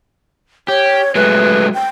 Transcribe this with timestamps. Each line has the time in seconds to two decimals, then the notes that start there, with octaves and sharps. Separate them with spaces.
0.68 G4 C#5
1.15 F#3 G#3 A3 B4
1.74 G5